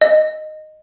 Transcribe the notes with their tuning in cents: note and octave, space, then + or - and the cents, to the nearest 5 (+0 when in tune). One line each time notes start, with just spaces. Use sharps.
D#5 -10